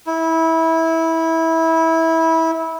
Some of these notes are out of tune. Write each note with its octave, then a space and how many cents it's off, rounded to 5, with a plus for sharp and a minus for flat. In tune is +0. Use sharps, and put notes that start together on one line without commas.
E4 -20